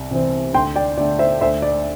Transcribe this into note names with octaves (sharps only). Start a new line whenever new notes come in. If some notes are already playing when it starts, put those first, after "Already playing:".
Already playing: C2
C3 E3 C4
D2 G5 C6
D5 G5
D3 A3 D5
C5 E5
D2 C5 E5
D5